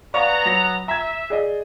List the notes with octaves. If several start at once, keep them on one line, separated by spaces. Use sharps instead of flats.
B3 D5 F5 A#5 C#6
F#3 A#6
E5 A#5 G#6
G#4 D5 D#5